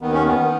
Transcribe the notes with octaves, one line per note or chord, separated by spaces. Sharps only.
D#2 D#3 B3
C#4
B3
D#3